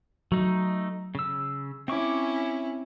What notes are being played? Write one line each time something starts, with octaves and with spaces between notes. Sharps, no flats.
F#3 A3 D#4
C#3 E6
C4 C#4 E4 C#6 D6